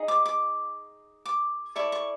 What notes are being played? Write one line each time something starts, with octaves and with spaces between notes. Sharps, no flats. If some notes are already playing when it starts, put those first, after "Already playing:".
Already playing: D#4 G#4
D6
D6
D6
E4 A4 D5 C#6
C#6